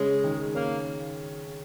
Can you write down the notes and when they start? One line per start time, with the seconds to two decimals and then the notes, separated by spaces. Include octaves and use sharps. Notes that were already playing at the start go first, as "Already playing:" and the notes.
Already playing: C#3 G#3 C#4
0.24 D#3
0.55 A#3 C#4